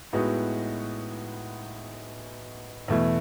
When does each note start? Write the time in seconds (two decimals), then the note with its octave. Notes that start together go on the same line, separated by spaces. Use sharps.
0.13 A2 G#3 B3 D#4 F#4
2.88 E2 B2 A3 E4